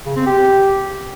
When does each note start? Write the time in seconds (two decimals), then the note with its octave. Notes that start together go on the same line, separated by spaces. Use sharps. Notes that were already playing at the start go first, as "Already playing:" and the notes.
0.06 C#3
0.16 C4
0.26 G4